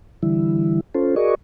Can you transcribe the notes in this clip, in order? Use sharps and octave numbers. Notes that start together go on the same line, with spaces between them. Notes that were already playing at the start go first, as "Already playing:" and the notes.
D3 E3 G3 E4
C#4 F4 A4 C5
F#4 G#4 A#4 D5 D#5 C#6